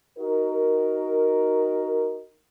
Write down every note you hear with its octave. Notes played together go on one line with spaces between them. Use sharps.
D#4 F#4 A#4